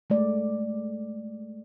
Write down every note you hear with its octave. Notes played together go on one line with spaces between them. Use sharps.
G#3 A3 D5